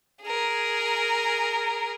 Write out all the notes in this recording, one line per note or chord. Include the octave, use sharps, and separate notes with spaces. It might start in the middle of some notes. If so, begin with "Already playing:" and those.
G#4 A#4